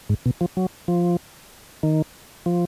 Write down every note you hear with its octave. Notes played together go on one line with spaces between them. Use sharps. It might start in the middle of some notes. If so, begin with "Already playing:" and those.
G#2
B2
F3
F#3
F3
D#3
F3